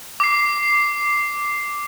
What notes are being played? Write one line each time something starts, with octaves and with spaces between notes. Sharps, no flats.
D6 C7